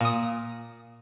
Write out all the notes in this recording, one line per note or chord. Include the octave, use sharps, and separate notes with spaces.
A#2 D#6